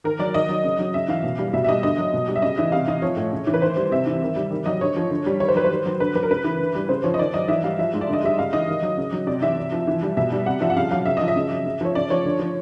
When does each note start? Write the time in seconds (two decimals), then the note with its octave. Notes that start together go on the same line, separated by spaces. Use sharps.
0.04 D#3 A#4
0.19 F#3 D5
0.34 D#3 D#5
0.49 F#3
0.64 C#3
0.79 F#3
0.94 C#3 E5
1.08 E3 F5
1.24 B2
1.39 G3
1.53 B2 E5
1.64 E5
1.69 G3 D#5
1.83 D3 D#5
1.98 F#3
2.13 B2
2.28 G3
2.36 E5
2.42 C#3 D#5
2.58 E3 E5
2.72 C3 F5
2.88 E3 D#5
3.02 F3 C#5
3.17 A2
3.32 C#3
3.47 E3
3.54 B4
3.62 D#3 C5
3.77 G3
3.92 C3 E5
4.07 E3
4.22 D#3
4.36 G3
4.51 D#3
4.66 F#3 D#5
4.81 D3 C#5
4.96 F3
5.10 D3
5.26 G3
5.40 D#3 C#5
5.48 C5
5.55 F#3 B4
5.65 C5
5.70 D#3
5.86 F#3
6.00 D3 B4
6.15 F#3 B4
6.23 A#4
6.30 C#3 B4
6.44 E3
6.60 D3
6.75 G3
6.89 C#3 C5
7.04 F3 C#5
7.14 D#5
7.19 D#3 D5
7.34 F#3 D#5
7.48 E3 E5
7.64 G3 F5
7.79 F3 E5
7.94 G#2
8.01 D5
8.09 D3 D#5
8.23 G3 E5
8.38 C#3 F5
8.53 E3 D#5
8.68 D#3
8.83 F#3
8.97 C#3
9.13 F#3
9.27 C3 D5
9.42 E3 E5
9.57 C3
9.72 F3
9.87 E3
10.02 G3
10.17 B2 E5
10.32 G3
10.46 C3 F#5
10.61 F3 E5
10.70 F#5
10.77 C#3 F5
10.91 F#3 F5
11.06 C#3 E5
11.17 F3 D#5
11.28 E5
11.36 C#3
11.50 F#3
11.65 C#3
11.81 F3 C#5
11.95 C#3 D5
12.10 F3 C#5
12.25 D3
12.39 F3